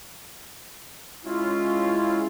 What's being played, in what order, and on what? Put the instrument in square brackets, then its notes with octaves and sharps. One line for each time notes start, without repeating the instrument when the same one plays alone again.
[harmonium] G#3 C#4 E4 [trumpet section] F4